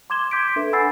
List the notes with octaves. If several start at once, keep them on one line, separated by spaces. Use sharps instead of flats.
C6 D6 G#6 E7 G7
D6 G6 B6 D7
D4 A4 B4 E5
F#5 G#5 B5 E6 A6 C7